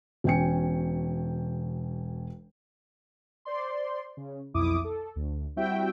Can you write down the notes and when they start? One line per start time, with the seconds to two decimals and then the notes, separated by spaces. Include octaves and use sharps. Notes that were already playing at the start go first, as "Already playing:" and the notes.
0.24 E1 B2 C#4 G5 G#5 C#7
3.45 C5 D5 C6
4.17 C#3
4.54 B1 F2 E4 D6 D#6
4.84 A4
5.16 D2
5.56 G3 C4 E4 F#4 E5 G5